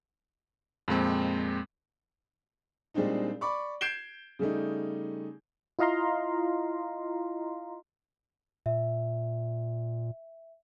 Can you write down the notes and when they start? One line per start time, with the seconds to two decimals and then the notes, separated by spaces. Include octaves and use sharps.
0.88 F2 A#2 G#3 C4
2.94 A#2 G3 G#3 C4 D4 D#4
3.41 D5 B5 C#6 D6
3.81 G6 G#6 C7 D7 E7 G7
4.39 C#3 G3 A3 D#4
5.79 E4 F4 D#5 F5 A#5 C6
8.66 A#2 E5